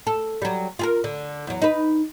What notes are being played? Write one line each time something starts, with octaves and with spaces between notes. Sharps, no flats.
A4
F#3 G3
F4 G#4 A#4
D3
E2 F#3
D#4 B4